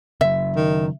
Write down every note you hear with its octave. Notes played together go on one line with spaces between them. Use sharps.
C#3 F#3 E5
D#3